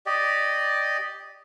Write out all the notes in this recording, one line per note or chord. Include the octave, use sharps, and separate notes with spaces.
G4 D5 D#5